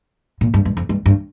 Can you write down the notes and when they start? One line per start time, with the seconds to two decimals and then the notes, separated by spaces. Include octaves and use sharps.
0.41 A#2
0.54 G2
0.65 G2
0.77 F2
0.89 G2
1.06 G2